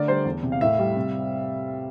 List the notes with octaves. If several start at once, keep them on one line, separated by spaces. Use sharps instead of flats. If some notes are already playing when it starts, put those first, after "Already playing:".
Already playing: D3 A3 A#4 D5
G3 C5
E2
C3
F5
A2 E5
G3
C3